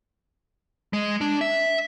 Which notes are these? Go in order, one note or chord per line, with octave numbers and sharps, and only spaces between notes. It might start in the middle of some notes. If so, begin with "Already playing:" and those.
G#3
D4
E5